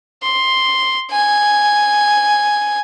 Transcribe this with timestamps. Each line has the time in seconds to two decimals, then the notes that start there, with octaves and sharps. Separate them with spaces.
0.23 C6
1.11 G#5